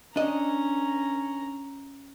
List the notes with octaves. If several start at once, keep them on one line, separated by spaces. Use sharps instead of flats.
C#4 D4 D#5 A#5